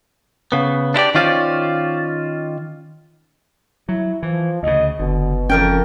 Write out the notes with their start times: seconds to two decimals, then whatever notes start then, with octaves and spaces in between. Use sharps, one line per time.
0.52 C#3 B3
0.94 D4 E4 G4 D5
1.15 D#3 C#4 F4 C5 D5
3.89 F#3 E4
4.23 E3 F3
4.63 D2 C#3 D#5
4.99 F#1 B2 D3
5.50 F2 C#4 A#4 G5